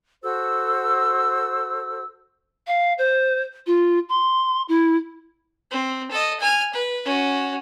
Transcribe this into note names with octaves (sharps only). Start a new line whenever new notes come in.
F#4 A4 C5 E6
F5
C5
F4
C6
E4
C4
A4 D#5
G#5 F6
B4
C#4 F#4